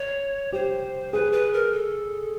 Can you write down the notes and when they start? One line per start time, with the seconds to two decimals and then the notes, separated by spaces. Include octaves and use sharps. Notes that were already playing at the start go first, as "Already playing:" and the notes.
Already playing: C#5
0.52 G4 C5
1.12 G#4 B4
1.32 B4
1.53 A#4
1.72 A4